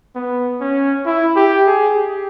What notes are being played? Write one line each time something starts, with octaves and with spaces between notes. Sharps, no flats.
B3
C#4
E4
G4
G#4
G4